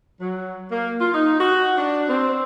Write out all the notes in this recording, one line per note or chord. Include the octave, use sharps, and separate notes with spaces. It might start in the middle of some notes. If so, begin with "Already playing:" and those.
F#3
A#3
F4
D#4
F#4
D4
C4